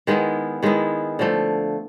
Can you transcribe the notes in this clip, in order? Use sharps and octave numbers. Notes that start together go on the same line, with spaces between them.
D#3 G#3 B3 E4
D#3 G#3 B3 E4
D3 F3 A3